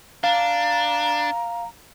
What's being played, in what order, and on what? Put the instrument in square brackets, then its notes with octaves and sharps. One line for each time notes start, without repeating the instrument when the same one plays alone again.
[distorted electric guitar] D4 [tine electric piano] F5 [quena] A#5